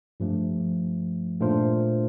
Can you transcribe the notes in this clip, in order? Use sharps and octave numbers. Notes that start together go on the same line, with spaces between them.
G2 F3 A3
A#2 A3 D4 F4 C5